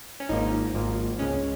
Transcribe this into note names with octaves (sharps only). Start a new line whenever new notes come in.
C#4
G#1 G#2 F3 A#3 D#4
G#1 G#2 F3 A#3
C#2 C#3 G#3 C#4